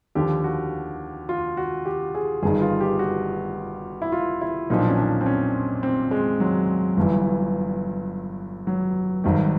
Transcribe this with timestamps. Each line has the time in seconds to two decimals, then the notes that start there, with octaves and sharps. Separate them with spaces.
0.15 D#2 D3 F3 G4
0.44 F#4
1.29 F4
1.57 F#4
1.85 G4
2.15 G#4
2.42 G1 G2 D#3 G#4
2.62 F4
2.81 G4
2.99 F#4
4.02 E4
4.12 F4
4.41 E4
4.70 B1 A#2 F3 D#4
4.79 D4
4.88 C#4
4.97 D4
5.21 C4
5.26 C#4
5.83 C4
6.11 G#3
6.40 F#3
6.97 G1 G2 E3
8.67 F#3
9.24 G#1 G2 D#3